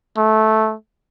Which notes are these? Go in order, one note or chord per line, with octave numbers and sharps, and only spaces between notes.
A3